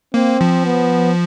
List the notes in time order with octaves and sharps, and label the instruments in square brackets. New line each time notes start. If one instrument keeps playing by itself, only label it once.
[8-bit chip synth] A#3 [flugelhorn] C4
[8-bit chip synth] F3
[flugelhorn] B3